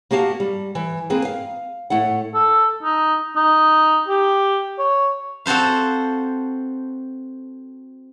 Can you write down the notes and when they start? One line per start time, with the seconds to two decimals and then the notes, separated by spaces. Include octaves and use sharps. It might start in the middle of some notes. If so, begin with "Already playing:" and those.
0.11 A#3 F#4 G4 F5 A5
0.40 G3
0.75 E3
1.10 A#3 C4 G#4 A#4 B4
1.25 F5
1.90 A2 A3 E4 F#5
2.34 A4
2.83 D#4
3.36 D#4
4.08 G4
4.79 C#5
5.46 C4 F#4 A4 C5 F5